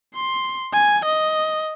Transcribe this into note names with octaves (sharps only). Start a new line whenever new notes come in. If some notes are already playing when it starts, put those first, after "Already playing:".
C6
G#5
D#5